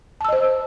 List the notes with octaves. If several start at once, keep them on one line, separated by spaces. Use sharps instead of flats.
C5 D#5 A5 E6